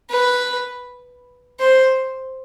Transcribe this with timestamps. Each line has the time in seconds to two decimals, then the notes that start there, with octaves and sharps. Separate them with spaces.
0.10 B4
1.59 C5